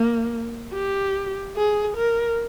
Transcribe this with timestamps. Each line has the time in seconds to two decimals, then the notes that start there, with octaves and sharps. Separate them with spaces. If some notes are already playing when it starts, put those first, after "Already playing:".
Already playing: A#3
0.73 G4
1.56 G#4
1.97 A#4